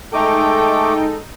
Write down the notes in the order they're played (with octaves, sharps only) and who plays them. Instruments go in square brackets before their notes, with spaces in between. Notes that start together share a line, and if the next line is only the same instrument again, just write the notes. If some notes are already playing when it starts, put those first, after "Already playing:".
[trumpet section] G#3 A4 [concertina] A3 D6 [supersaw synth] D#4 [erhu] G5